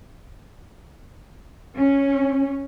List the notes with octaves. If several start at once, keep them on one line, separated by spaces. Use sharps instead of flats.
C#4